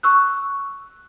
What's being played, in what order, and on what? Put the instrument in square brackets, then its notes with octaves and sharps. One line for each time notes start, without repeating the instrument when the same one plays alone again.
[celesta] C#6 E6 F#6